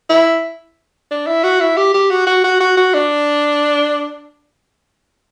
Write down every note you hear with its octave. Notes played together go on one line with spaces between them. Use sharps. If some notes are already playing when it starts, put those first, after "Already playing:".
E4
D4
E4
F#4
E4
G4
G4
F#4
F#4
F#4
F#4
F#4
D4